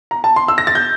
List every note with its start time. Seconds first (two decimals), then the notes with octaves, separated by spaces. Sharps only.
0.11 A#5
0.24 A5
0.36 C6
0.48 E6
0.58 A#6
0.67 A6
0.75 G6